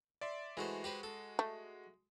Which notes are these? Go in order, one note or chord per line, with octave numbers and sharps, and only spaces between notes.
D5 E5 C6
E3 G#3 A3 F#4 C5
G4 B4 C5
A4
A3